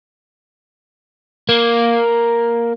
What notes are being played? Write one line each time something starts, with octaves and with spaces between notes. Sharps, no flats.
A#3